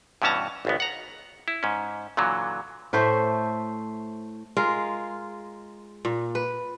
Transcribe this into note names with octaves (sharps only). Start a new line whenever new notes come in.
G2 B2 E3 C#4 A5 A#5
G#1 C#2 B3
F#5 A#5
E4
G#2 C#4
A#2 D3 E3 F#3
A2 A3 C5 E5
G#3 F4 A#4
A#2
B4